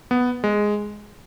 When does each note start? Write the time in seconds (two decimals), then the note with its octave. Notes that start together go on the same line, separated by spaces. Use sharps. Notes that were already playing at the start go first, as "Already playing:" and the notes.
0.11 B3
0.44 G#3